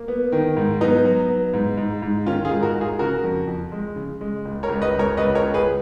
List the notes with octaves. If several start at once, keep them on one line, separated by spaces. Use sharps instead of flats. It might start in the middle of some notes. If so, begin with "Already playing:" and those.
Already playing: A#3
B3
D#3
G#2
F#3 B3 D#4
F#3
B3
G#2
G#2
G#2
D#3 C#4 F4
F4 G#4
G#2
F#4 A#4
G#2
F4 G#4
C#3 F#4 A#4
F2
F2
G#3
C#3
G#3
C#2
A#4 C#5
C#2
B4 D#5
C#2
A#4 C#5
C#2 B4 D#5
A#4 C#5
C#2
G#4 B4